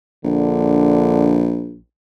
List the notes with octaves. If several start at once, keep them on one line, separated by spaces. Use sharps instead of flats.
A#1 D3